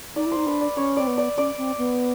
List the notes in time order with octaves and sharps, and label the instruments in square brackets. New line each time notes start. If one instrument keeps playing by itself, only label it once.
[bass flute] D#4 [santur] D5
[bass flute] E4
[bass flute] D#4 [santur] C5
[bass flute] D4 [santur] B4
[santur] D5
[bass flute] C#4 [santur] C#5
[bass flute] C4 [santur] D5
[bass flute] B3
[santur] D5
[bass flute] C#4 [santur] D5
[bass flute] C4
B3